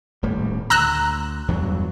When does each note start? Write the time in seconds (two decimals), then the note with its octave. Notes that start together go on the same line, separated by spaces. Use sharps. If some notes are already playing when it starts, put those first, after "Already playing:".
0.22 D#1 A2 G3
0.70 D2 A#5 E6 F#6
1.48 E2 G2 F#3